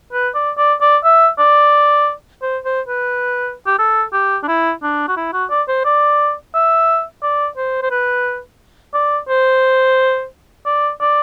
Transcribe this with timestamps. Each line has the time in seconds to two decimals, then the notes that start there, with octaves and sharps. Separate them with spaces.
0.13 B4
0.35 D5
0.58 D5
0.81 D5
1.04 E5
1.39 D5
2.42 C5
2.65 C5
2.88 B4
3.67 G4
3.79 A4
4.13 G4
4.43 D4
4.48 E4
4.83 D4
5.08 F#4
5.17 E4
5.33 F#4
5.50 D5
5.68 C5
5.85 D5
6.55 E5
7.23 D5
7.57 C5
7.82 C5
7.91 B4
8.94 D5
9.29 C5
10.66 D5
11.01 D5